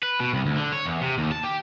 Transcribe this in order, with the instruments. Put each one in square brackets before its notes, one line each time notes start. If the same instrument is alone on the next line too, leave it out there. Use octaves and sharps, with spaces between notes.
[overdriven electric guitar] B4
B2
C2
D2
D3
C#5
E2
C3
D#2
A5
G4